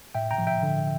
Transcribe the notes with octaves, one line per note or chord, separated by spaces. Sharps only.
A2 E5 G5
G5 A#5
F3
E5 G5
D3